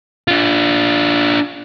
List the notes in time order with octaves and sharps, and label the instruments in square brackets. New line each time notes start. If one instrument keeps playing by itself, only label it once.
[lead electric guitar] D4 F4